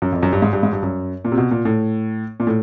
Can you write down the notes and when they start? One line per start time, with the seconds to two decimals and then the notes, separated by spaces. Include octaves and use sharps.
0.02 F#2
0.12 F2
0.23 F#2
0.33 G2
0.42 G#2
0.53 G2
0.63 G#2
0.73 G2
0.83 F#2
1.25 A#2
1.32 C3
1.37 B2
1.51 A#2
1.65 A2
2.40 A#2
2.47 A2